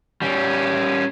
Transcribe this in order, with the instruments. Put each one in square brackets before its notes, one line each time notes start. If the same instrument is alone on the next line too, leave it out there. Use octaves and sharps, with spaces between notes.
[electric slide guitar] G3 C#4